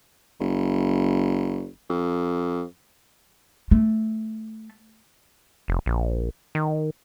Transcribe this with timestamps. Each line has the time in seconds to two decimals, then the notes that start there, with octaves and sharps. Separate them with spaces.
0.40 F#1
1.89 F2
3.71 A3
5.68 F1
5.86 A#1
6.55 D#3